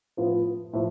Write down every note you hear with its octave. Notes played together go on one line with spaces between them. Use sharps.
A2 F3 B3 F4
A2 F3